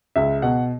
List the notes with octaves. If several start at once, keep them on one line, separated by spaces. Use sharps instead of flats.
C#2 E5
B2 F#5